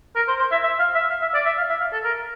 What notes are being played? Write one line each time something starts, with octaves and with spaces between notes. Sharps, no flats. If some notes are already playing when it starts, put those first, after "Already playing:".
A#4
C5
C5
E5
E5
F5
E5
F5
E5
D5
E5
F5
E5
F5
A4
A#4